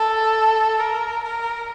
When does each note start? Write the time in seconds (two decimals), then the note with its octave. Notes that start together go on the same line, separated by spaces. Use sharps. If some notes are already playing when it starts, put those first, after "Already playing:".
Already playing: A4
0.79 A#4
1.23 A#4